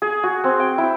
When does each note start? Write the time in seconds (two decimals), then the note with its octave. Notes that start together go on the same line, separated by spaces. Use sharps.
0.02 G#4
0.23 F#4
0.44 C4
0.60 G5
0.78 E4